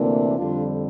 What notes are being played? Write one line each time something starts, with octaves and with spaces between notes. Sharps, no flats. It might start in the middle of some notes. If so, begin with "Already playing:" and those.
Already playing: D2 C3 E3 A#3 D4
F2 D3 G3 D4 F4